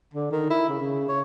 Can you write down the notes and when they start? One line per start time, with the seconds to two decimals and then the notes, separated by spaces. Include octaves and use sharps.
0.14 D3
0.32 D#3
0.50 E4
0.69 C#3
0.80 C#3
1.09 C#5